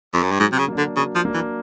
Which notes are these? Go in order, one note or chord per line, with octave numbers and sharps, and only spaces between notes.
F2
F#2
G2
G#2 F#3
C3
C#3
A#3 D4
D3
C#3 F#3
F3
A#3 D4
E3